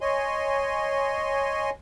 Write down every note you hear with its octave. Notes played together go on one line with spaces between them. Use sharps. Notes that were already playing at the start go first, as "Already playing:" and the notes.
C#5 D#5 G#5 C6